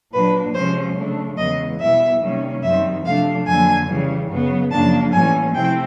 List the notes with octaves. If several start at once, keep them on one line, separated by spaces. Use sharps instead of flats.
A#2 F#3 A#3 D4 B4
C3 F3 G#3 C#4 C5
C#3 F#3 A3 D4
E2 C#3 E3 G#3 B3 D#5
B2 G3 B3 E4 E5
C3 D#3 G3 A#3 C#4
F#2 D#3 G3 C4 E5
C3 F3 A3 D4 F5
F2 D3 F#3 A#3 G#5
C#3 E3 G3
F#2 C#3 F#3 B3
F#2 C#3 F3 A#3 D4 A5
A2 E3 G3 A#3 C#4 G#5
C3 F3 A3 C4 E4 G5